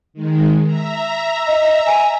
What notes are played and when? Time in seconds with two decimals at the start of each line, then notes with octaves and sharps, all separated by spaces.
0.13 D#3 G#3
0.64 E5 A#5
1.47 D#5
1.86 G#5